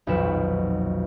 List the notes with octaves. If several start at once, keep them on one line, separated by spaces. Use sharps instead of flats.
D#1 B1 F2 F#4 B4 E7